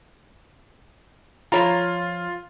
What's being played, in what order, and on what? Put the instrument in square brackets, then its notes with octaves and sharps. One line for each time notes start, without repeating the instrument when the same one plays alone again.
[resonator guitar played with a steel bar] F3 C#5 A#5 [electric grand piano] F4